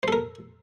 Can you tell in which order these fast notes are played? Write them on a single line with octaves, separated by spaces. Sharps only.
C5 A4 A#4